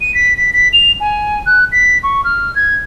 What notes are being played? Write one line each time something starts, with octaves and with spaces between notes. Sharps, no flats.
D#7
B6
B6
B6
F7
G#5
F#6
B6
C#6
F6
G#6